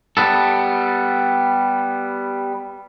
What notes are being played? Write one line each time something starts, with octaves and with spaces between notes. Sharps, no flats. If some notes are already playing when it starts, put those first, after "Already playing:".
G3 B3 A4